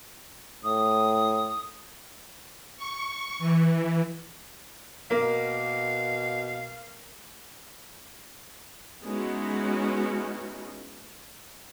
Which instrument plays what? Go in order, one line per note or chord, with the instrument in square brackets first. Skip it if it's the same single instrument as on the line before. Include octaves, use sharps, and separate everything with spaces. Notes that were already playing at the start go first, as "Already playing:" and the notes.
[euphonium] A2 [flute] D#6
[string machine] C#6
E3
[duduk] B2 [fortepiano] A#3 [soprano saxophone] F5
[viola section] G#3 B3 C#4 D#4 E4 F#4